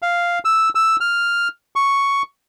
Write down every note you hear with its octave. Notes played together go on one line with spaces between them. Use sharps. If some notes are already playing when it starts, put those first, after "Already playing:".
F5
E6
E6
F6
C#6